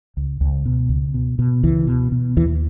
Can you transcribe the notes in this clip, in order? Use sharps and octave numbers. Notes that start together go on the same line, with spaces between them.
C#2
C#2
B2
C#2
B2
B2
C#2 E3
B2
B2
D#2 E3